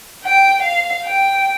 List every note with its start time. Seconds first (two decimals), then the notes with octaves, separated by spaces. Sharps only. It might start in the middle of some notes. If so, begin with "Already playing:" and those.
0.24 G5
0.62 F5
1.05 G5